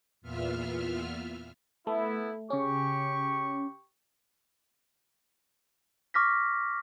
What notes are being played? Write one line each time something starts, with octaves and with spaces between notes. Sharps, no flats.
E2 A#2 B3 F4 E5 F6
A3 B3 E4
C#3 C#4 G4 C#6
C#6 D6 F6 A#6 B6